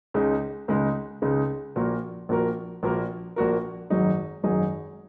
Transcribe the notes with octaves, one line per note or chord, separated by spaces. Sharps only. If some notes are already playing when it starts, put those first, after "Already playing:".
C#2 C#3 G#3 D#4
C#2 C#3 G#3 D#4
C#2 C#3 G#3 D#4
A#1 A#2 A#3 F#4 A#4
A#1 A#2 A#3 F#4 A#4
A#1 A#2 A#3 F#4 A#4
A#1 A#2 A#3 F#4 A#4
G#1 F#2 F#3 D#4 G#4
G#1 F#2 F#3 D#4 G#4